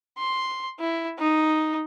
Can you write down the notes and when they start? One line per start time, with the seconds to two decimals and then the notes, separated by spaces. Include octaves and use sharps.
0.18 C6
0.80 E4
1.19 D#4